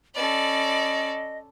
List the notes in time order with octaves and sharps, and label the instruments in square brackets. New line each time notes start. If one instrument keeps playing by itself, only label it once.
[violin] C#4 A4 [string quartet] D5 B5 [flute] D#5